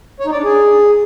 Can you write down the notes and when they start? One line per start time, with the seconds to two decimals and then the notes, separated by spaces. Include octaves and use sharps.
0.20 C#5
0.26 D#4
0.32 D5
0.38 D4
0.44 G#4